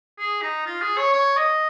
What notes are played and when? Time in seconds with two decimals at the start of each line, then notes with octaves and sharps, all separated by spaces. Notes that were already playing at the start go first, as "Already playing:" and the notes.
0.19 G#4
0.42 D#4
0.66 F4
0.81 G#4
0.97 C#5
1.13 C#5
1.37 D#5